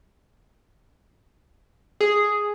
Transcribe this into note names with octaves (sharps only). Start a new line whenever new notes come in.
G#4